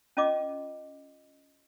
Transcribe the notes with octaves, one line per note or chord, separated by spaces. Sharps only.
C#4 F4 D#5 D6